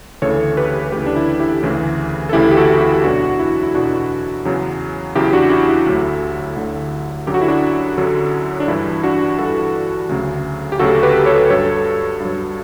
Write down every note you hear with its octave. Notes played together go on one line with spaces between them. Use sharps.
D2 C#3 E3 A4 C#5
G4 B4
D2 C#3 E3 G4 B4
D4
E4
E4 G4
D2 C#3 E3
A4
D2 C#3 E3 E4 G4
G4
F#4 A4
E4 G4
E2 B2 F#3 D4 F#4
E4
E4
E2 B2 F#3 D4 F#4
E2 C#3 F#3
E2 C#3 F#3 E4 G4
D4 F#4
E4 G4
E4
D2 D3 F#3
D2 D3 F#3
F#2 D3 F#3 G4
F#4
E4
D4 F#4
F#2 D3 F#3
D4
G2 E3 E4
D4 F#4
G2 E3 F#4 A4
D2 C#3 F#3
G4
D2 C#3 F#3 F#4 A4
G4 B4
A4 C#5
G2 F#3 A4 C#5
G2 F#3